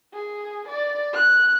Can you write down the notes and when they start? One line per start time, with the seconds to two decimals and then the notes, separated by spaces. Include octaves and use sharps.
0.13 G#4
0.68 D5
1.14 F#6